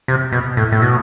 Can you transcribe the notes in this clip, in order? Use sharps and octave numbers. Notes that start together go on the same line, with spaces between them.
C3
B2
A2
A2
B2